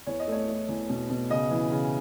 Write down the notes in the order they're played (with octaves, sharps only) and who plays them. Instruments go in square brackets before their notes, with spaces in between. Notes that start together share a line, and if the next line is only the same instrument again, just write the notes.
[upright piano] E2 C#5
D#5
A3 C#5
A3
E2
B2
B2
C#3 D#5
E3
C#3